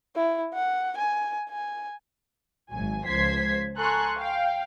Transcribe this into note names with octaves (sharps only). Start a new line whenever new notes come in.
E4
F#5
G#5
G#5
G#1 F#3 G#5
C#2 F3 C5 G#6 B6 C7
A4 G#5 A#5 C6 C#6 F#6
F5 G5